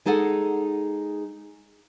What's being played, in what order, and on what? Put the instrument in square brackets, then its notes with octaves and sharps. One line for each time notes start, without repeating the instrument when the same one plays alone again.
[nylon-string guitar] G#3 D#4 G#4 A4 F#5